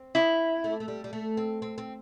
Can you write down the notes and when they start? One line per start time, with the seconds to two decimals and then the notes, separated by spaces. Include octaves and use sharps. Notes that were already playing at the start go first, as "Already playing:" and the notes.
Already playing: C4
0.15 E4
0.64 A3
0.80 A3
0.88 G3
1.04 G3
1.13 A3
1.37 C4
1.62 C4
1.78 C4